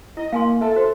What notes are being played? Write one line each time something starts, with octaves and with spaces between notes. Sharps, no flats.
E4 D#5
A#3 F5 G#5 C6
A4 E5 A5
F#4 C5